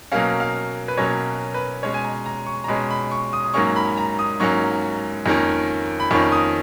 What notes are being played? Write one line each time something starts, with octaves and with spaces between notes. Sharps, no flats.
B2 F#3 A#3 C#4 F5
F5
B4
B2 F#3 A#3 C#4 C#5
B4
B2 G#3 C#4 C#5
G#5
A#5
A#5
C#6
A#5
B2 G#3 C#4 B5
B5
C#6
D#6
D#6
G#2 F#3 A#3 C#4 C#6
B5
A#5
D#6
G#2 F#3 A#3 C#4 C#6
F2 D#3 A#3 C#4
B5
F2 D#3 A#3 C#4 C#6
D#6